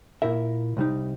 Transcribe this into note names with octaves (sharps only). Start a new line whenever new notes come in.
A#2 E4 A#4 E5
C2 G3 D#4